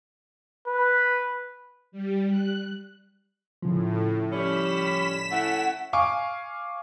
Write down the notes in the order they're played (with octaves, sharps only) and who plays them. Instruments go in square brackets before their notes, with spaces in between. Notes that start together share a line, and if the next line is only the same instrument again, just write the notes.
[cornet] B4
[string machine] G3
F#6
[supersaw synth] A2 [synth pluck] C#3 F3
[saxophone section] G3 C#4 [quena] B5 [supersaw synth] B6 E7
[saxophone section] A3 C#4 E4 [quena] F#5
[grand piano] F5 G#5 C#6 D6